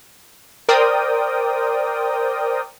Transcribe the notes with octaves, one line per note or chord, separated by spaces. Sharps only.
A#4 C5 D5 G5 D#6